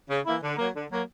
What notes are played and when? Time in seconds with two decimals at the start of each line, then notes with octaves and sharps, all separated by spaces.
0.09 C#3
0.25 E3 A#3 E4
0.42 D3
0.57 F#3 A#3
0.75 D3
0.90 F#3 A#3